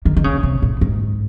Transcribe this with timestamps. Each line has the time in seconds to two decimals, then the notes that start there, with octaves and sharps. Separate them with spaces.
0.05 D#3
0.17 D#3
0.24 C#3
0.43 C3
0.62 A2
0.81 G#2